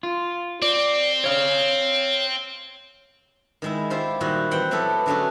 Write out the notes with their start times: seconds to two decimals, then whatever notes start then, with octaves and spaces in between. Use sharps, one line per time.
0.03 F4
0.62 C4 D5
1.24 C#5 F5
3.62 D#3 G#3 E4
3.90 E4 F4 G4 C5
4.20 A#2 D#3 G3 E4 F#4
4.51 E3 C4 F#5 G5
4.71 F#3 B3 E4 G4 A4
5.06 D3 F#3 A3 C#4 F#4 G#4